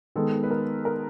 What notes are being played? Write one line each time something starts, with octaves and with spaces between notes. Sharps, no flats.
D#3 G#3 B3 A4
B4
A#4
A#4